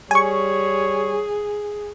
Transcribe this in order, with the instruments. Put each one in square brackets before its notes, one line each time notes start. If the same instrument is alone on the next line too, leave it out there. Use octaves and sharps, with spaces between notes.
[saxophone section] G3 [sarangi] G#4 [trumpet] C#5 [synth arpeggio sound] G#5 C#6